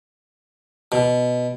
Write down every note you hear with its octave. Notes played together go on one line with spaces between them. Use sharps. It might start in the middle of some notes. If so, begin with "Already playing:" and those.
B2